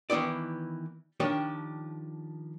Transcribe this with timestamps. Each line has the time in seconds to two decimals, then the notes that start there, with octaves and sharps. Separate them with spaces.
0.10 D#3 E3 B3 E4 D5
1.20 D#3 F3 D4 G4 C#5